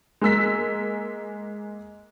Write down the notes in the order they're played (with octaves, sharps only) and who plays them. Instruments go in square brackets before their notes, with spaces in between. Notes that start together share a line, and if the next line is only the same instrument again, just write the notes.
[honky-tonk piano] G#3 A#3 E6 B6